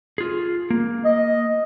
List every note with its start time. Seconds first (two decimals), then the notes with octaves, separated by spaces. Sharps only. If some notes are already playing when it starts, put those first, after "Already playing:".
0.18 F4 G#4
0.70 A#3
1.04 D#5